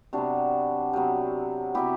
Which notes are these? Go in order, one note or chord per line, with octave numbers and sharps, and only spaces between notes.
C3 F#3 B3 D4 F#4
C3 F#3 B3
C3 F#3 B3 E4 G4